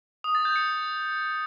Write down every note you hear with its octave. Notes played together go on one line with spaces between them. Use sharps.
D#6
A6
G6
C#7